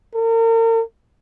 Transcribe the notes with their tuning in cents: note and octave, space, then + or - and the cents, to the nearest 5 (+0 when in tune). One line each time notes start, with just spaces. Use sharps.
A#4 -40